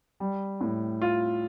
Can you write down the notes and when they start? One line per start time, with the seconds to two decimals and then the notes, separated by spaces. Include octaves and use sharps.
0.20 G3
0.61 A2
1.02 F4